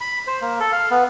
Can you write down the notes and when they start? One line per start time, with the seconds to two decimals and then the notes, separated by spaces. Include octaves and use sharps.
0.01 B5
0.27 C5
0.41 A#3
0.60 A4
0.72 F5
0.91 B3